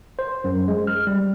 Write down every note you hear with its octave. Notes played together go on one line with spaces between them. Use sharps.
C5
F#2
G#3
F6
G3